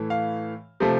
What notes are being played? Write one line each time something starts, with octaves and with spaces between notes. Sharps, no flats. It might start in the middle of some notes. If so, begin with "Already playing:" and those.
Already playing: A2 E3 A3
F5
C3 F3 A3